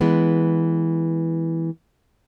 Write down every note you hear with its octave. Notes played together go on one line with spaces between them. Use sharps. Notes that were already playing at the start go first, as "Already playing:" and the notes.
E3 G#3 B3